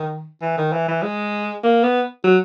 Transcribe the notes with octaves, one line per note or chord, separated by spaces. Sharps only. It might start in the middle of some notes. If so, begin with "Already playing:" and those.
Already playing: D#3
E3
D#3
E3
E3
G#3
A#3
B3
F#3